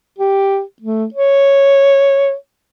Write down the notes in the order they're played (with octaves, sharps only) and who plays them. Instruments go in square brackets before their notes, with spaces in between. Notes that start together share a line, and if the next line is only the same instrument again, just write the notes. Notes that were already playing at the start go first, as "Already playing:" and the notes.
[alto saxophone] G4
A3
C#5